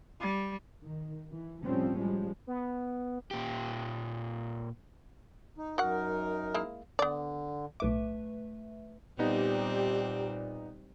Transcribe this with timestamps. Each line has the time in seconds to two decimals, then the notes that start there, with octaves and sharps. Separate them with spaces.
0.20 G3
0.83 D#3
1.33 E3
1.64 A2 F3 G3 C4 C#4
1.98 F3 G3 G#3
2.47 B3
3.31 A#2 G4
5.58 D#4
5.78 F#2 D#4 F#4 A#4 F#5
6.54 G#3 A#3 E4
6.99 D3 B3 D5
7.80 B1 A2 A3 B4 E5 D6
9.19 A#2 G3 B3 C4 D#4 G4